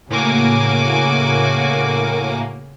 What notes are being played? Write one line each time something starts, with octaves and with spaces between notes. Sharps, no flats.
A2 C#3 A#3 F#4 G#5 D6